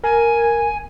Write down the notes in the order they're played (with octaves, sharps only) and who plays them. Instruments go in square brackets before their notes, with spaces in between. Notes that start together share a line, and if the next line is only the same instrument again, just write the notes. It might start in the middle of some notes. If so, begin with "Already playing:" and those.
[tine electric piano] A#4 [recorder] G#5